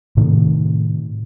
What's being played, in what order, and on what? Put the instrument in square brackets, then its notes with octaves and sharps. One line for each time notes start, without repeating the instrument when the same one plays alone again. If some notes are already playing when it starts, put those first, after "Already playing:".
[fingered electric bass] A2 C3 D#3